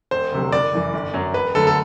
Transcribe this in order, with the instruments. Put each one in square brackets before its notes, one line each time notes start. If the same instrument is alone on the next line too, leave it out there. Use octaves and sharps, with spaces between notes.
[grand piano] E1 C5
D2 C3 F#3
F#1 D5
F#2 E3
G1
F#2 F#3
E1 B4
D2 D3 F#3 A4
A4